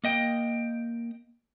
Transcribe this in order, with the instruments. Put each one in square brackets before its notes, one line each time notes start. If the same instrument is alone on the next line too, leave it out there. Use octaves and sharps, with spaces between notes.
[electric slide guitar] A#3 D#5 G5